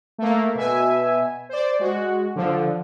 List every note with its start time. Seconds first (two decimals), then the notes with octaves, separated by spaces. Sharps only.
0.18 A3 A#3
0.55 B2 E5 G#5
1.49 C5 D5
1.79 G#3 F#4
2.36 D3 F3